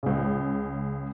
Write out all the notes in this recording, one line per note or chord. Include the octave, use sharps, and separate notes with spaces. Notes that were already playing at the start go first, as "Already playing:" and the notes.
C#2 C#3